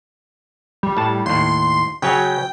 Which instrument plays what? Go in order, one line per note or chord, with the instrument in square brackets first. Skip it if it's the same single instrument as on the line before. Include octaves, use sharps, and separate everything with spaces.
[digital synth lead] G3
[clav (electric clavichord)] A2 A5
[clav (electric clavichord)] D#2 A2 [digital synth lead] C6
[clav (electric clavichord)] C#3 F#3 C#4 [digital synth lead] G5